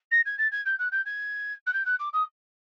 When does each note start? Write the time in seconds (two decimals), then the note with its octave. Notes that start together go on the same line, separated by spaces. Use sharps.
0.11 A#6
0.25 G#6
0.38 A6
0.52 G#6
0.66 G6
0.79 F#6
0.92 G6
1.05 G#6
1.66 F#6
1.73 G6
1.85 F#6
1.99 D6
2.13 D#6